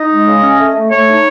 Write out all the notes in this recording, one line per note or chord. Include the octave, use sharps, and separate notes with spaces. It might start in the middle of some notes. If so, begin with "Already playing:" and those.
Already playing: D#4 D#5
G#3
C#3
C#4
A3
A3
A3 C#5
D#4